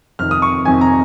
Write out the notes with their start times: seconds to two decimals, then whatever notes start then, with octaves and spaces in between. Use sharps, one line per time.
0.19 F2 C3 D#3 F6
0.31 D#6
0.42 C#6
0.65 F2 C3 D#3 G#5
0.81 A#5